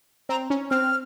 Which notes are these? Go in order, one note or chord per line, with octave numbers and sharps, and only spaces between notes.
C4 A#5
C#4
C4 F6